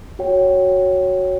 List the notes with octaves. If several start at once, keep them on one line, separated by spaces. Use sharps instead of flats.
F#4 C#5 G5